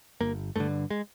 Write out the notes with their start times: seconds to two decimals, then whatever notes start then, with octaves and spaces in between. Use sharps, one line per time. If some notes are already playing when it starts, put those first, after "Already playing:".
0.21 G1 A#3
0.56 G2 D3 A3
0.90 G#3